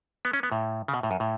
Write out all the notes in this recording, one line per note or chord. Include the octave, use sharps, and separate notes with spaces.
B3
C#4
B3
A2
C#3
B2
A2
F#2
A2